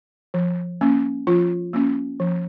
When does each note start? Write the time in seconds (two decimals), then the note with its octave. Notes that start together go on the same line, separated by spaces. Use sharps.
0.34 F3
0.81 A#3 C#4
1.27 F3 F4
1.73 A#3 C#4
2.20 F3